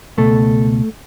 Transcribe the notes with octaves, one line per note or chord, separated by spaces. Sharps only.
C#2 B2 A3 A4